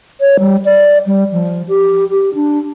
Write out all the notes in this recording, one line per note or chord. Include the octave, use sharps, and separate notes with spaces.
C#5
G3
D5
G3
F3
G4
G4
D4